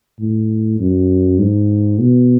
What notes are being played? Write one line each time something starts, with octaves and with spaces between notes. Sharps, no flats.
A2
F#2
G#2
B2